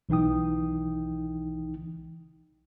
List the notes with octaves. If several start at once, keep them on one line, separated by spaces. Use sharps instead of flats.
B1 E3 D#4 G5 D#6